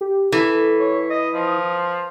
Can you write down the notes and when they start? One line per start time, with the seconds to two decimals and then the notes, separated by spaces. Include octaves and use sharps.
0.01 G4
0.32 E3 A4
0.80 C#5
1.10 D#5 D#6
1.35 F3